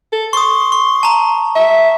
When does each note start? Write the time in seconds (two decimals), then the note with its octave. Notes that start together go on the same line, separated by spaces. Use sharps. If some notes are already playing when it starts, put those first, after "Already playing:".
0.13 A4
0.33 C6 C#6 D#6
0.72 C#6
1.03 A5 A#5
1.55 E5